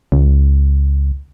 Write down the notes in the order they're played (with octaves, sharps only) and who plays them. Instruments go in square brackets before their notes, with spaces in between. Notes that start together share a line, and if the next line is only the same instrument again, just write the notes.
[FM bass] C#2